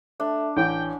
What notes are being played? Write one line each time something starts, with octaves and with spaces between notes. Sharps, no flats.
A3 D4
A1 C#4 G5